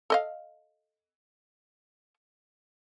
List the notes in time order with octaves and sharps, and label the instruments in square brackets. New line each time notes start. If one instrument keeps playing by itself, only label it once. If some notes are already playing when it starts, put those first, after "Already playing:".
[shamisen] A4 D#5 F5